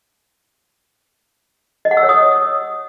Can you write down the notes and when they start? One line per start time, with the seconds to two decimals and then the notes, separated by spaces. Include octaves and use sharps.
1.85 D#5
1.91 F#5
1.97 E6
2.03 C#5
2.09 D#6